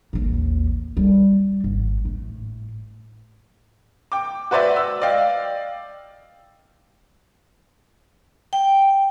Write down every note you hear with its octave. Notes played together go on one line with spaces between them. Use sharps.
A1 D#2
G3
G#1
A2
G5 D6
F#4 B4 C5 D5 E5
E6
D5 D#5 F5 G5
G5